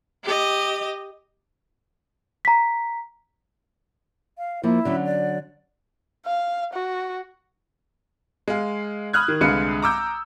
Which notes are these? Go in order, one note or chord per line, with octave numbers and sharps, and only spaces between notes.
G4 D#5
A#5 B6
F5
F3 A#3 E4
D3 F#3 C#4
D5
F5
F#4
G#3 F5
B5 D#6 F6 F#6 G#6
D#3
C2 D3 G#3 B4 F5 C#7
A#5 D6 E6 G6